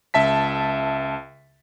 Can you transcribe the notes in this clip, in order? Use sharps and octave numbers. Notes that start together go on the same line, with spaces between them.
C#2 E5 A5 B6